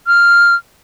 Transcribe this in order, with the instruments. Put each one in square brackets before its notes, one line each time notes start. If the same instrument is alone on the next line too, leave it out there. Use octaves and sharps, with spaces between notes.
[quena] F6